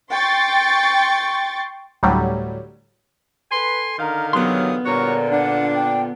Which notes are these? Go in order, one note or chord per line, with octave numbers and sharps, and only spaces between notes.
G5 C6 C#6 A6
D2 A2 F#3 G3
A4 B4 G#5 C6
D3 D#3 A#4 F5
C3 E3 F#3 B3 C6 D#6
A#2 D3 G3 F#4 A#4 C#5
D4 F#5
G5